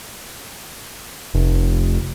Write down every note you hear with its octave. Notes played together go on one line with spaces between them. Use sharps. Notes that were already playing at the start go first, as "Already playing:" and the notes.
F1